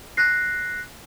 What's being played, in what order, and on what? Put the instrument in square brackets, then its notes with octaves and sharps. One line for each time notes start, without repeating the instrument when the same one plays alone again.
[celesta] F#6 A#6 C7